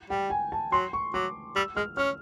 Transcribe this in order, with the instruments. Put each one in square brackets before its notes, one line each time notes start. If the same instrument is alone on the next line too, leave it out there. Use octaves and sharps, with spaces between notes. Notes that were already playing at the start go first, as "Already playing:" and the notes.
[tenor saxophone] G3 [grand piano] G5
[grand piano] G#5
A5
[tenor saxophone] F#3 [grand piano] C6
[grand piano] C#6
[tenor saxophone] F#3 [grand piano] D6
[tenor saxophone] G3 [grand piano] E6
[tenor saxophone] G#3 [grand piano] F6
[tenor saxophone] C#4 [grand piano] F6